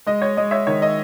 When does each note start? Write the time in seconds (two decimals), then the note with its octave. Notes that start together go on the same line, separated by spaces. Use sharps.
0.07 G#3 D#5
0.22 C#5
0.37 G#3 D#5
0.51 C#5 E5
0.67 D#3 C#5
0.82 D#5